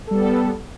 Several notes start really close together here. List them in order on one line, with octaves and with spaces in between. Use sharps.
A4 G3 B3